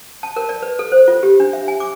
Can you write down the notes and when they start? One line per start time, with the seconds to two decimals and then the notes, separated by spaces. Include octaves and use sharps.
0.23 A5
0.36 A#4
0.49 D5
0.62 B4
0.79 A4
0.92 C5
1.08 F4
1.23 G4
1.40 D4
1.53 E5
1.68 G#5
1.80 D6